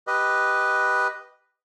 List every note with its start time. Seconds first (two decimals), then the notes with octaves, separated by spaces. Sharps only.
0.07 G4 B4 D#5